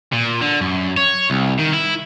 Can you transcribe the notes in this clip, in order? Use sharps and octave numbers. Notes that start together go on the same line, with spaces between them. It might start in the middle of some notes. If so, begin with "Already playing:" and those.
A#2
D3
F#2
C#5
C2
D#3
E4